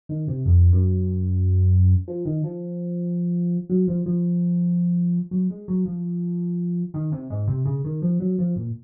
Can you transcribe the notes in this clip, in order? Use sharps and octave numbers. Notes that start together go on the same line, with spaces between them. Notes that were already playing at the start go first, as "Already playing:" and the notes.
D#3
C3
F2
F#2
F3
D#3
F3
F#3
F3
F3
F#3
G#3
F#3
F3
D#3
C3
G#2
C3
C#3
D#3
F3
F#3
F3
A#2